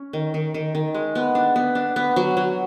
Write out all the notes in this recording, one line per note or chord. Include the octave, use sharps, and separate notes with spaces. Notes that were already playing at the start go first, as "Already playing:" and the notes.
Already playing: C#4
D#3
D#3
D#3
D#3
G#3
B3
D4
B3
D4
B3
F#3
F#3